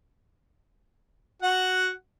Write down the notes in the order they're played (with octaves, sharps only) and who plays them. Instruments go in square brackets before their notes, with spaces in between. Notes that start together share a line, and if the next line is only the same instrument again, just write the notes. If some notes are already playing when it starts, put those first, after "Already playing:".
[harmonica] F#4 F#5